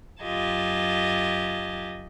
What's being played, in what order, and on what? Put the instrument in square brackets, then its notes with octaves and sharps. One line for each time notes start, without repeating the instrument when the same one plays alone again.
[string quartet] F#2 F4 G4 D#5 A5 G#6